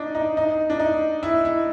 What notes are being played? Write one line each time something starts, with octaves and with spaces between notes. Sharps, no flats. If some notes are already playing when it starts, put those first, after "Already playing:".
Already playing: D4 D#4
D#4
D#4
D4
D#4
E4
E4